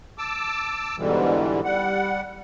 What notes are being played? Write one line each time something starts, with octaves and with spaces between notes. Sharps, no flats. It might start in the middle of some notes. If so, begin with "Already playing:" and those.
A5 D6 E6
G#2 B2 D3 E3 G3
G3 F#5